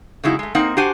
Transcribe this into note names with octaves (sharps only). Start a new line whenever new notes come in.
C#3 F#3 G#3 D#4 E4 F#4
G#3 A3
A#3 C4 D#4 F#5
D4 F#4 G4 C5 F#5 G#5